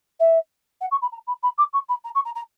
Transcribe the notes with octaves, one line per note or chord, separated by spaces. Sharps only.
E5
F#5
C#6
B5
A#5
B5
B5
D6
C#6
B5
A#5
C#6
A#5
A#5